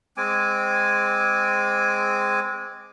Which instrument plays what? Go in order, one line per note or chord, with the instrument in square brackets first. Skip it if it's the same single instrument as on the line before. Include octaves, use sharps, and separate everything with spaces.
[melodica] G#3 C4 G#5 D6